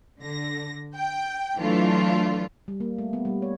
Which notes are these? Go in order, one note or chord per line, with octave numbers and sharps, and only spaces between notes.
D3 A#6
G5
E3 F#3 A3 D4 F4
G3
A#3
A3
B3
G3
C#5